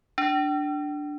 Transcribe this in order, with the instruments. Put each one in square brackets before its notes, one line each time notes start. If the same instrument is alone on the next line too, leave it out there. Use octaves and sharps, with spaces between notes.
[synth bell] D4